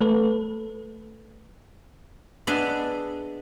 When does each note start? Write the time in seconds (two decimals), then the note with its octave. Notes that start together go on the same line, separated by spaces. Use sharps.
0.01 A3 A4 B4
2.47 B3 D4 G#4 D#5 E5 G#5